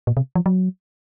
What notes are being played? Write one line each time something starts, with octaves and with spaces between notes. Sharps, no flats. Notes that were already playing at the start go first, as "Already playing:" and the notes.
A#2
C3
F3
F#3